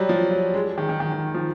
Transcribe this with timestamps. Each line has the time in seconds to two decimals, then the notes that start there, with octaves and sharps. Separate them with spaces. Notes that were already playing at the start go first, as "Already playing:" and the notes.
Already playing: F#3 G3
0.09 F3
0.31 F#3
0.54 G#3
0.78 D#3
0.89 D#3
1.00 D#3
1.12 D#3
1.34 F3